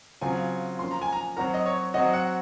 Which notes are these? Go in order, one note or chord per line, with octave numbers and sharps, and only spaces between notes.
C#3 F#3 C4 F4 G#5
F3 A#3 C#4 C6
A#5
G#5
A#5
F#3 C4 F#4 A#4 A#5
D#5
C#5
F#3 C4 F#4 D#5
F#5